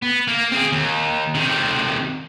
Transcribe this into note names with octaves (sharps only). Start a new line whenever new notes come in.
B3
A#3
C4 G#4
D#2
C3 D#3